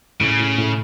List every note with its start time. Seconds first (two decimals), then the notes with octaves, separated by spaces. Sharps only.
0.21 A2 C#3
0.39 A2
0.58 A2